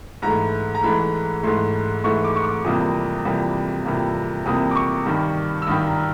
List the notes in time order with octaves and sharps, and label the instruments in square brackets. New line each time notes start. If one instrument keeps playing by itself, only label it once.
[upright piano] G#2 E3 A3 A#5
A#5
G#2 E3 A3 B5
G#2 E3 A3 C6
G#2 E3 A3 C#6
D6
C#6
D6
F2 C3 E3 G3 A#3 D#6
F2 C3 E3 G3 A#3
F2 C3 E3 G3 A#3
F2 C3 E3 G3 A#3 D#6
D6
C#6
G2 D#3 G3
E6
G2 D#3 G3 D#6
A#5